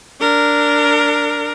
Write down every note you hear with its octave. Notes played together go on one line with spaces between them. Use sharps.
D4 A#4